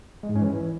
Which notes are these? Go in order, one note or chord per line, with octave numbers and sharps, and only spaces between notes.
G#3
G#2
C#4
E3